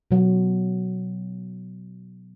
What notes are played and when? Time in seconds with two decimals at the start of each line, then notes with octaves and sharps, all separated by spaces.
0.11 B2 F#3